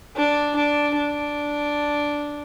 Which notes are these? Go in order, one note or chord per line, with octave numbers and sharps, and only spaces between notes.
D4
D4
D4